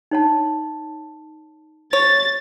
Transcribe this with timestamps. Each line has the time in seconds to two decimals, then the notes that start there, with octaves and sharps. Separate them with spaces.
0.11 D#4 C#5 A5
1.93 C#5 A6